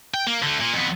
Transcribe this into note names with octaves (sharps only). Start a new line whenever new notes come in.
G5
A#3
D3 A3
A#2
F2 B3